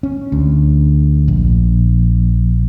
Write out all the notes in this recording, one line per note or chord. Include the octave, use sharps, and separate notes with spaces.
C#4
D2
A#1